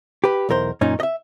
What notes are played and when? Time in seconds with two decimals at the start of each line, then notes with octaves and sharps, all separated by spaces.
0.24 G4 B4
0.49 B1 E2 A#4 C5
0.81 F#2 A#2 C#4 D#4
1.00 D#5 E5